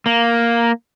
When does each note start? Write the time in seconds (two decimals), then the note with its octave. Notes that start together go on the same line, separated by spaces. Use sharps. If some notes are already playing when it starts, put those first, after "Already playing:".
0.06 A#3